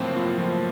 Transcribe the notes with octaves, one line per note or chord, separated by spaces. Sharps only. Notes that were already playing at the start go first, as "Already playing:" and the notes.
Already playing: A2 F3 F#3 A#3 C4
F4
F3